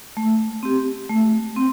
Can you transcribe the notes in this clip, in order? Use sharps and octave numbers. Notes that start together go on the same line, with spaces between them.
A3
C4 G4
A3
C4